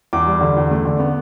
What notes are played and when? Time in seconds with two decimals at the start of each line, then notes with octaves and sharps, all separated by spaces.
0.13 E2 D6
0.26 G3
0.41 D3
0.57 E2
0.71 A3
0.85 D3
1.00 B3